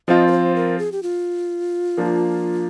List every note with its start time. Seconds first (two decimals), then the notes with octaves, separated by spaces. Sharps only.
0.08 F3 C4 F4 D#5
0.28 A#4
0.32 C5
0.55 A#4
0.79 G#4
0.92 G4
1.03 F4
1.97 F3 A#3 D4